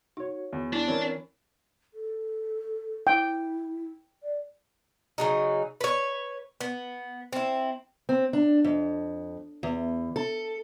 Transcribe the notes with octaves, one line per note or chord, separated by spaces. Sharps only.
D#4 F#4 C#5
E2
D4 E4
E3 C4 C#4 A#4
A4
E4 G5
D5
C#3 F#3 D#4
B4 C#5
B3
C4 E4
C4
D4
F2
E2
A4